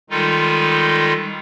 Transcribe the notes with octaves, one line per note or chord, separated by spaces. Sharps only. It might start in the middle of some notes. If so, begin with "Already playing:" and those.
D#3 G3 G#3 D#4 F4 A4